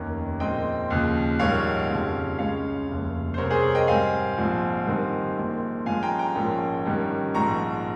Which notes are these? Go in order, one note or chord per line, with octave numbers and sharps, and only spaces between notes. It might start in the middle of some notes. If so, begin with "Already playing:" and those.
Already playing: F1 D#2 D#3 A#3 C#4 A#5
A#1 A#2 G#3 C4 D#5 G5
D#2 C#3 F3
A#1 G#2 D#3 G3 C#5 F5
F2 C#3 G3
C#2 C#3 G#3 C#4 C#5 F5
F1 D#2 C#3
C5
C2 C3 G3 C4 A#4 C#5
G#4 C5
A#4 C#5
D#5 G5
G#2 G3 C4 F5 G#5
A#1 G#2 F3 C4
G2 D#3 G3 C4
A#1 A#2 G#3 C4
G2 F3 G#3 C#4 F5 G#5
G5 A#5
G5 A#5
A#1 G#2 F3 A#3 C#4
G2 D#3 G3 C#4
A#1 G#2 F3 A#5 C#6